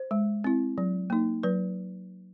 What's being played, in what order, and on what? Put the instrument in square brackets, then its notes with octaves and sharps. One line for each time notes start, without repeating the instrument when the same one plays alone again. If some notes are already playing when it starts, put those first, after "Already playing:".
Already playing: [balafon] C5
G#3
C4 E4
F#3
A#3 D#4
F#3 B4